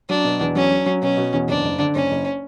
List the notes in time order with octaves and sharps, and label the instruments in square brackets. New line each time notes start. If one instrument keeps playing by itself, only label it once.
[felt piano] F#3 [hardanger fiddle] D4
[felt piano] B2
E2
[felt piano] F#3 [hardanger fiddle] C#4
[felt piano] F#3
F#3
[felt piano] B2 [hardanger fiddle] C#4
[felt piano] B2
E2
[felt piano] F#1 [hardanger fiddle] D4
[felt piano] F#1
D3
[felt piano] F#1 [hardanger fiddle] C#4
[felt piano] F#1